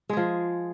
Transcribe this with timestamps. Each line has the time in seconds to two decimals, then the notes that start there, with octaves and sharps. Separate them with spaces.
0.09 G#3
0.13 G#4
0.17 F3